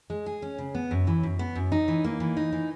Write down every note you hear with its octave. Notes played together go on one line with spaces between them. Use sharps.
G#3
G#4
C#4
C#3
B3
F#2
E3
F#2
B3
F#2
D#4
E3
A#3
E3
D#4
E3